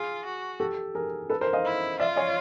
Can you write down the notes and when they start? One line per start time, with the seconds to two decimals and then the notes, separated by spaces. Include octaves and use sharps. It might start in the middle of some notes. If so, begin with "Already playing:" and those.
Already playing: F4 G#4
0.25 F#4
0.60 G4 A4
0.95 G#4 A#4
1.30 A4 B4
1.41 A#4 C5
1.53 D#5 F5
1.65 E4
2.00 F4 D5 E5
2.16 C#5 D#5